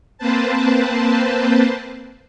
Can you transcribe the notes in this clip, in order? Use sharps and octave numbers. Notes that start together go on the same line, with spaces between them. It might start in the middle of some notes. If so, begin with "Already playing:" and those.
A#3 C4 B4 C5 A5